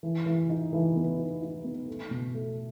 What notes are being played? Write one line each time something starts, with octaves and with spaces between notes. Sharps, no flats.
E3
E3
D#4
E3
B3
D#4
D#4
B3
A3
B2
A3